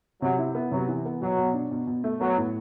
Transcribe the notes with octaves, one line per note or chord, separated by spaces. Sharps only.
C3 F#3
E4
B3
C3 F#3
E3
B3
B2 F#3
B2
D4
B2
B2
A3
F#3 B3
A2